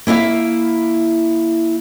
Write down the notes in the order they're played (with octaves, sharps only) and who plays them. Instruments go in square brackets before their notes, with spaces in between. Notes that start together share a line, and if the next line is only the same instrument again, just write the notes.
[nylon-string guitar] A#3 E4 E5 F5